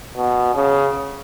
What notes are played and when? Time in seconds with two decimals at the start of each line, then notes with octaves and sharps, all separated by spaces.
0.17 B2
0.55 C#3